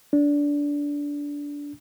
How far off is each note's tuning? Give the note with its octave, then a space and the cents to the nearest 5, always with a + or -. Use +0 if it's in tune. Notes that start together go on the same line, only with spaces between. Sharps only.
D4 -20